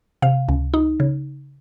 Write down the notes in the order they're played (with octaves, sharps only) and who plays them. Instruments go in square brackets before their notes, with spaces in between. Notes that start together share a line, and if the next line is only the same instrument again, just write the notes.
[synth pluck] C3 F5
C#2
D#4
C#3